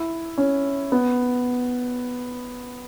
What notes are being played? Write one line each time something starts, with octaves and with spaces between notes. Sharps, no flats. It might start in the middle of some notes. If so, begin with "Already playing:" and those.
Already playing: E4
C#4
B3